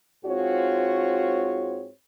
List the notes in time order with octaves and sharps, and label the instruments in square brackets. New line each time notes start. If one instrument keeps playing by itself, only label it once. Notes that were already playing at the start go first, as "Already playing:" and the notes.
[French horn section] G#2 C4 F4 F#4 G#4 C#5